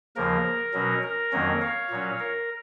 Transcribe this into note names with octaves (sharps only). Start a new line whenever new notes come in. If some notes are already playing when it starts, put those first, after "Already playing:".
D#2 C#3 F3 A#3 A#4
B2 F#3 C#4
A#4
F2 D#3 F#3 A#3 C#4
C#5 F5
A#2 F#3 C#4
A#4